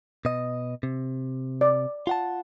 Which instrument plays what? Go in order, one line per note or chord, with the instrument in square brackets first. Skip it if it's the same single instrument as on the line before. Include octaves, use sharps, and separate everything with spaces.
[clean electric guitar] B2 D#5
C3
[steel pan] D5
[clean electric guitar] F4 F#5 A5